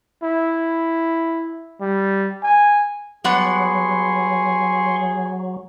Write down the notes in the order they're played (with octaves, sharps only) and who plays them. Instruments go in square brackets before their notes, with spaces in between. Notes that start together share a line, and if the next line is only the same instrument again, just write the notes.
[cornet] E4
G3
G#5
[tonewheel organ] F#3 [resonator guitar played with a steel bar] G3 B3 F#5 [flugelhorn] G#4 [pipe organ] C6 C#6